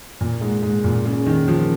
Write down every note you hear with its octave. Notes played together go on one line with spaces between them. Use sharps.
A#2
G#2
G#2
A#2
C#3
D#3
F3